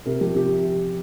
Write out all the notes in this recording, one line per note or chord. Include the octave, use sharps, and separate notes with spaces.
C3 A#4
F3 G4
C3 G4